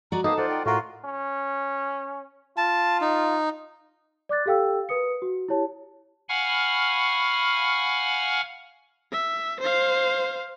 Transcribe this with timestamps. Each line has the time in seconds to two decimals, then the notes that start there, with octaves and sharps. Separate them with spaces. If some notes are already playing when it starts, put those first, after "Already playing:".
0.12 F#4 D5 D#5 A#5
0.24 A#3 B3 D#4 A4 D#6
0.38 F4 C5 D5 D#5 F#5
0.49 G5
0.66 A2 F4 F#4 A#4 F5 F#5
1.05 C#4
2.57 F4 A5
3.01 D#4
4.29 D5 D6 F#6 A6
4.46 G4 A4 F5 G5 E6
4.89 A#4 B4 D#6 C#7
5.22 F#4
5.48 E4 G4 C#5 A5
6.29 F5 F#5 G#5 B5 C#6 F6
9.12 E5
9.60 C5 F5